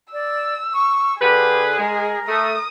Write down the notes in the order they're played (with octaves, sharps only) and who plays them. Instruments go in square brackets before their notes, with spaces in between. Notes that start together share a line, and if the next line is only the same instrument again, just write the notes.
[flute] D5 [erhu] E6
[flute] C#6
[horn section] D3 B4 [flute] G4 [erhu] G#4
[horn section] G#3 [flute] A#4
[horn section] A3 [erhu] D#6